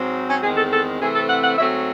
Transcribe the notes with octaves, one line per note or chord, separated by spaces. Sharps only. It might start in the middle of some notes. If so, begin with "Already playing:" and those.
Already playing: G#2 F#3 C4
C#4
E2 D#3 G#3 C4 G#4
A4
A4
C3 E3 A3 C4 G#4
A4
F#5
F#5
G#2 F#3 A3 C4 E5